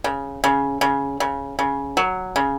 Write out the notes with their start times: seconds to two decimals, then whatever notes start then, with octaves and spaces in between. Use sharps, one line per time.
0.04 C#3
0.44 C#3
0.81 C#3
1.20 C#3
1.59 C#3
1.97 F#3
2.36 C#3